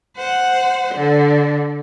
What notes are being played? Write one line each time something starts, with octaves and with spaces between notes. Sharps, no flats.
C5 F#5
D3